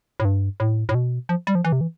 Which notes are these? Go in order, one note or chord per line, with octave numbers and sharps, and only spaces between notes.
A2
G2
A2
A2
B2
F3
G3
F3
E3
C3
E3